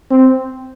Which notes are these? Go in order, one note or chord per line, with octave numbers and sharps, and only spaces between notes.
C4